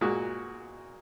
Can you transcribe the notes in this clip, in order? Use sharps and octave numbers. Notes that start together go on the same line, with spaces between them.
A#2 G#3 F#4